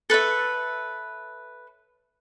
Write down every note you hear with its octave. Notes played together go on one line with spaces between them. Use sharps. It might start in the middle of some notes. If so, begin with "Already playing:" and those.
A4 B4 C#5 E5